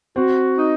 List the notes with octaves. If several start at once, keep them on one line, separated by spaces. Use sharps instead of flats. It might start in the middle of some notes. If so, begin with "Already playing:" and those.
C4 F#4
D#4